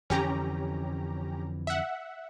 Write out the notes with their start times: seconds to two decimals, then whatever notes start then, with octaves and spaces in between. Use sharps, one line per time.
0.10 F2 D3 E3 C#4 G4 A#5
1.67 E5 F#5